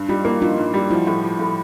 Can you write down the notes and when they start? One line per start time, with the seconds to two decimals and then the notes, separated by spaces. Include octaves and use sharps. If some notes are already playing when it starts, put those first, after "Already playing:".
Already playing: G2
0.09 G3 D#4 F4
0.25 A#3 E4 F#4
0.42 G2 D#4 F4
0.58 G2
0.74 G3
0.91 F3 E4 F#4
1.07 A2
1.23 F3
1.39 A2